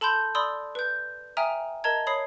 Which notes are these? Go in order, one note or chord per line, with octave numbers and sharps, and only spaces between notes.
A4 A5 B5 C6 G6
D5 B5 C6 D#6 E6
B4 G6
E5 G5 G#5 A#5 D#6 F6
A#4 D#5 A5 A#5 G#6
C#5 B5 D#6 C7